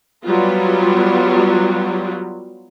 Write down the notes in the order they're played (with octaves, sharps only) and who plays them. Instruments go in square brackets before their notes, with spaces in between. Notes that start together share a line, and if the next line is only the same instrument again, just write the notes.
[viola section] F#3 G3 B3 F4